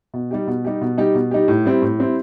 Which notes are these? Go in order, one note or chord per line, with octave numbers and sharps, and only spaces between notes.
B2
G3 D#4 G4
B2
G3 D#4 G4
B2
G3 D#4 G4
B2
G3 D#4 G4
A2
G3 C4 E4
A2
G3 C4 E4